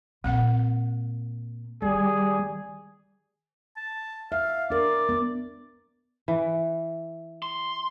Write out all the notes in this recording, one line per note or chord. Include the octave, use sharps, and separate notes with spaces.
A#2 A#3 C4 F#5
D#3 G3 G#4
A5
E5 F5
D4 A#4 D5
B3
E3
C6